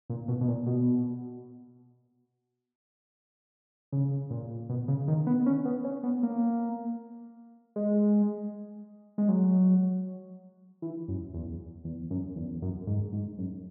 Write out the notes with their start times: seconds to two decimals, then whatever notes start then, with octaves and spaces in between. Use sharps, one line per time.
0.10 A#2
0.28 B2
0.41 B2
0.48 A#2
0.67 B2
3.92 C#3
4.31 A#2
4.69 B2
4.88 C#3
5.08 D#3
5.27 B3
5.46 C#4
5.65 B3
5.84 C#4
6.03 B3
6.23 A#3
7.76 G#3
9.18 G#3
9.29 F#3
10.82 E3
11.08 F#2
11.34 E2
11.85 E2
12.11 F#2
12.36 E2
12.62 F#2
12.87 G#2
13.12 G#2
13.38 F#2